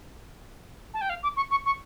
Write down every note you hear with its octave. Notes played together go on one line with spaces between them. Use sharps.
A5
G5
F5
D6
C#6
C#6
C#6